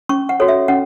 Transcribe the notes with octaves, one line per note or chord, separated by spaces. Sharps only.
C#4 C#6
F#5
F#4 A4 C#5
E5
C#4 F#5